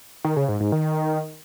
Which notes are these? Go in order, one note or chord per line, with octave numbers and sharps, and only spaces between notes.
D#3
C#3
G#2
G#2
D#3